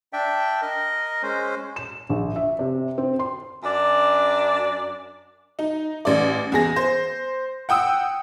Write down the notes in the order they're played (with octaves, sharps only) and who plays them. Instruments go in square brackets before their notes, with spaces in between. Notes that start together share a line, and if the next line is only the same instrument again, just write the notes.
[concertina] D4 D5 E5 G5
A#4 D#5
G#3 C#4 C5
[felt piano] E7
A#1
E5
C3
C4
C6
[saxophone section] F#2 D4 D5
[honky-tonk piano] D#4
A1 D5
E2 G#4 A#6
C5
F#5 G5 D#6 E6